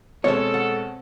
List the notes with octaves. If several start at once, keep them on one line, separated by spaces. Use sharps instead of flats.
B2 G#3 C4 A4 C#5 A5
F#5